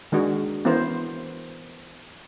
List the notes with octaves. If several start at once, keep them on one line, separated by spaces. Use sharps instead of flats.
D#3 G#3 D4 F#4 A#4
E3 B3 C#4 E4 A#4 C5